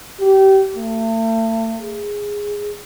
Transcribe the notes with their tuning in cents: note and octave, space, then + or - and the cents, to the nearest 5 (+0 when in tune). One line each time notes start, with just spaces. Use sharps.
G4 -25
A3 +40
G#4 -10